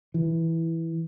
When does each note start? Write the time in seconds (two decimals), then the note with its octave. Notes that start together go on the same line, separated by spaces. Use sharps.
0.14 E3